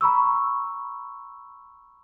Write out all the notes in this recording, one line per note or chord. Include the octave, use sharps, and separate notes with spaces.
A#5 B5 C#6 E6